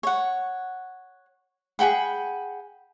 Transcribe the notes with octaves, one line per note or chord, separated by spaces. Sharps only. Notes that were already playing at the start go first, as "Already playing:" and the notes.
C#5 F#5
G#4 F#5 G5 B5